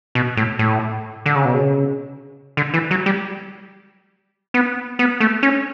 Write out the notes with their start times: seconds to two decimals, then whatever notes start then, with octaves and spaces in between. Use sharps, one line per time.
0.15 B2
0.37 A2
0.59 A2
1.26 D3
1.35 C#3
1.45 B2
1.54 C#3
2.57 D3
2.74 E3
2.91 F#3
3.06 G3
4.54 B3
4.99 B3
5.20 A3
5.43 C#4